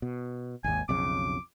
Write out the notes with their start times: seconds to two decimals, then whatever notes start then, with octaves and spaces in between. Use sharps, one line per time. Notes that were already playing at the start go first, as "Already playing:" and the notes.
0.02 B2
0.64 G#1 D#2 G#5
0.89 B1 F2 C#3 D6